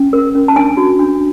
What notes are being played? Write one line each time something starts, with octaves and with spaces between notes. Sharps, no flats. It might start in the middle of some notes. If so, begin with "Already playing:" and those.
Already playing: C#4
A#4
C#4
A5
D4 G#5
F#4
D4